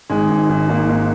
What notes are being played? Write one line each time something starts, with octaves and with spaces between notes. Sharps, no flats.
G#1 G#3
G#1
G#1
G#1 A#3
G#2